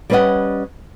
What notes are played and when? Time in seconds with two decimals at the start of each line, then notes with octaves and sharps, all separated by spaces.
0.10 G3 C#4 B4 C#5 D#5 F#5